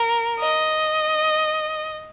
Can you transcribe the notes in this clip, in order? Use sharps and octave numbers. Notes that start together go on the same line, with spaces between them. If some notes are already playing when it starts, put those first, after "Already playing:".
Already playing: A#4
D#5